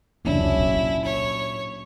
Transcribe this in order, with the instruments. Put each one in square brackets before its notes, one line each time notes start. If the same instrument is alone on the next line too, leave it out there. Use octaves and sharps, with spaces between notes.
[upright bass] F1 C#2 [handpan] F#3 C#4 D4 [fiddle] E4
[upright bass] A#2
[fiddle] C#5